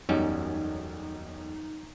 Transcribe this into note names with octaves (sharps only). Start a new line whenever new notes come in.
E1 B1 F#2 G3 C#4 D#4